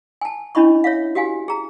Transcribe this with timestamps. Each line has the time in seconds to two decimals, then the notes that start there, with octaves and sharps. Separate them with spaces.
0.21 G#5 A5
0.55 C#4 D4 E4 D#5 B5 C#6
0.84 C#5 E5 F5
1.15 F#4 G4 F5 G#5
1.48 G#4 A#5